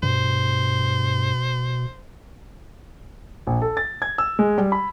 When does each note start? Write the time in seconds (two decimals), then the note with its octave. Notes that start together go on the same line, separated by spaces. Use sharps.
0.03 G2 B2 C5
3.47 A#1
3.62 A4
3.77 A6
4.02 G#6
4.18 E6
4.39 G#3
4.58 G3
4.72 B5